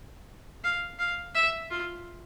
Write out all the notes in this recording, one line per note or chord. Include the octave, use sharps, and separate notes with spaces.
F5
F5
E5
F4